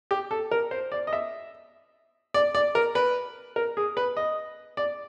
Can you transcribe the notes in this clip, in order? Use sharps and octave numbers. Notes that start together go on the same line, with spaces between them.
G4
A4
A#4
C5
D5
D#5
E5
D5
D5
A#4
B4
A#4
G#4
B4
D#5
D5